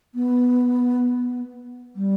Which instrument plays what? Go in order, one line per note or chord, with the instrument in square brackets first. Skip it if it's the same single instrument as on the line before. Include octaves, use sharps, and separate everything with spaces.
[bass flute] B3
G3